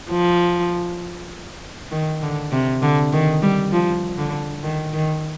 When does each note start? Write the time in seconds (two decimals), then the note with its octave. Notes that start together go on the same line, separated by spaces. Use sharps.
0.11 F3
1.92 D#3
2.22 D3
2.52 C3
2.82 D3
3.13 D#3
3.42 G3
3.72 F3
4.18 D3
4.63 D#3
4.93 D#3